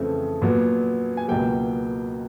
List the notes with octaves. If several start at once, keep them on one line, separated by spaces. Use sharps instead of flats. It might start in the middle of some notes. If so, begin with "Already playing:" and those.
Already playing: F2 C#3 E3 A3 C4
A#2 F#3 B3
G#5
C#2 B2 F#3 A#3 G5